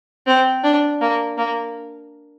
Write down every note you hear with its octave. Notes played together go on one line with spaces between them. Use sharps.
C4
D4
A#3
A#3